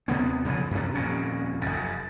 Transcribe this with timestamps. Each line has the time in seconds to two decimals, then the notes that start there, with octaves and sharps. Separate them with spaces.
0.08 D#2 C3 B3 C4
0.45 F2 C#3 E3 F3
0.71 F#2 C3
0.95 D#1 F2 A#2 C#4
1.62 F1 F#2